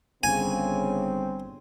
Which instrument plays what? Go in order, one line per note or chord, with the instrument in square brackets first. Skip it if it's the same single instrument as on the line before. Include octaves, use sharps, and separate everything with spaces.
[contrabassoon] G1 [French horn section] C#3 [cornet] C4 [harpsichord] G#5